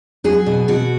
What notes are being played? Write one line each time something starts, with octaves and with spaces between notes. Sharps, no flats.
F#3 G#4
B2
B2 F#4